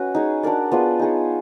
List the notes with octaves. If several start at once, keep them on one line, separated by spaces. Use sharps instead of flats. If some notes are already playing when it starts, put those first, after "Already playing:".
Already playing: C#4 F#4 B4 D#5
D#4 G#4 C#5
D4 F#4 A#4 D5
B3 D4 F4 G#4
D#4 G#4 C#5